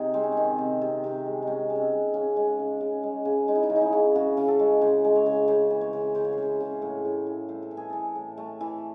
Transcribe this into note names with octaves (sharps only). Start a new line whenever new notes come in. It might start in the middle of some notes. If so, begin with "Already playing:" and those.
Already playing: C3 D#4 G#4
G#3 C4
C#4
D#3 C4
C3
C3
C3
G#3
G#3 C#4 D#4
G#3
C#4
C4
G#3
C#3 C#4
G#3
C#3
C#3
G#3
C#3
G#3 D#4
E4
D#4
C#3
D#4
E4
C#3
C#3 F#4
C#3
A4
G#3
C#3 C5
G#3
C#5
C#3
C#3 C5
E3
C#5
C#3
C#3 C5
C#5
C5
C#3
C#3
A2
A2
E3
A3 C5
A4
E3
G#4
E3 A4
A2
A3
E3